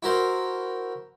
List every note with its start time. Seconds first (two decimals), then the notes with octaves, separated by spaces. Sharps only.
0.03 E4 F#4 A#4 C5